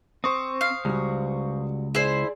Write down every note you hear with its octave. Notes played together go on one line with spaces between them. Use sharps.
C4 C5 C#6 D#6
F5
C#2 G3 F#4
E4 G#4 C5 D5